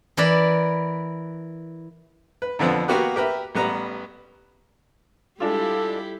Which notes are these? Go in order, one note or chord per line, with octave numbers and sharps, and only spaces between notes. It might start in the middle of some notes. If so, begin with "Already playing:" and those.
E3 A#4 B4 D5 B5
B4
F2 D3 F3 B3 C4
A#3 B3 F#4 G4 B4
G4 A#4 B4 E5
A1 G3 B3 B4 A#5
G3 G#3 D4 E4 F4 G4 A4